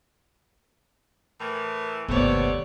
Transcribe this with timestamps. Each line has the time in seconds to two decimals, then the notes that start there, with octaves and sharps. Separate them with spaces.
1.40 A2 E3 A#4
2.08 G1 D#2 C3 G3 A3 B3 C#5 D5